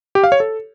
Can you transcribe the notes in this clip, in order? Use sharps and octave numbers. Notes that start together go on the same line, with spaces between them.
G4
F5
C#5
A4